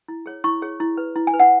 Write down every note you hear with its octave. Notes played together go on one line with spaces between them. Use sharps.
E4
G#4 C#5
E4 C#6
G#4 C#5
E4
B4
E4
G#5
B4
F#5